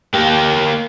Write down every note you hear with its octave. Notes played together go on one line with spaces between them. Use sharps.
A#3 G4